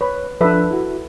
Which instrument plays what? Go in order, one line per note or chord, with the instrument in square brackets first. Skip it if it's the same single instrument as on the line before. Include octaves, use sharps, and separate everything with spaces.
[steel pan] B4 [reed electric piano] C#5 B5
[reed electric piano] F3 D4 [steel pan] A4 B4 E5
[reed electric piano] E4 F#4